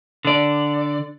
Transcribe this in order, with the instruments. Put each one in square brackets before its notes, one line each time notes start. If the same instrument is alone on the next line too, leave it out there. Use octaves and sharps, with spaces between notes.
[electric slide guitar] D3 D5